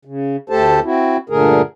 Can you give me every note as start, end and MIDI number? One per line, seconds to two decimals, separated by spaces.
0.05 0.36 49
0.50 0.80 38
0.50 0.80 57
0.50 0.80 67
0.50 0.80 69
0.50 0.80 72
0.50 0.80 81
0.84 1.17 60
0.84 1.17 64
0.84 1.17 66
1.29 1.62 43
1.29 1.62 46
1.29 1.62 50
1.29 1.62 57
1.29 1.62 68
1.29 1.62 70